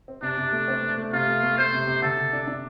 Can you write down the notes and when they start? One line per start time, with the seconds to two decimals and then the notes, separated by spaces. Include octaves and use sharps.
0.08 C4
0.22 C3 D4
0.37 C3
0.52 A3
0.68 C4
0.82 A3
0.98 A3
1.13 C3 F4
1.27 A3
1.43 A3
1.58 A3 C5
1.73 C3
1.87 C3
2.02 D3 A4
2.17 D3
2.33 D4
2.48 D4